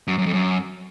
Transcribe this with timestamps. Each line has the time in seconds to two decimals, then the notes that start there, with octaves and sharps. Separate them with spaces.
0.07 F#2
0.18 F#2
0.26 F2
0.33 F#2